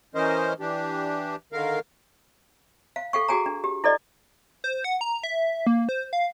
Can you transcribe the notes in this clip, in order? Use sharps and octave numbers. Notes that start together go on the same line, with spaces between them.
E3 C#4 A#4 C5 D#5
E3 D4 G4
D3 D#3 A#4 F5
F5
A4 F5 G5 C#6
F#4 G#4 G5 G#5 A#5
D4
G4
E4 A4 D5 D#5
C5
F#5
A#5
E5
A#3
C5
F5